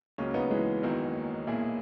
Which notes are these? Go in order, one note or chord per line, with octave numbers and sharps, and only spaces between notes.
C#2 C#3 F#3 A#3 C#4
B3 D#4
E3 G#3
F#1 E2 D#3 F#3 A#3
B1 A#2 A#3 E4 G#4